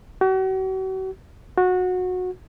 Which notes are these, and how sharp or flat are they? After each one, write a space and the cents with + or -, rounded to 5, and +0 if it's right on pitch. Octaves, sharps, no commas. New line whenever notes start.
F#4 +40
F#4 -20